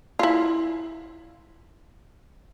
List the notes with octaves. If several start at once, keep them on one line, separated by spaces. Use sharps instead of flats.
E4 F4